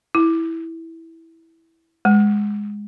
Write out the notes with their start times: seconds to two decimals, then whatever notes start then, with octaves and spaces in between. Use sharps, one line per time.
0.15 E4
2.05 G#3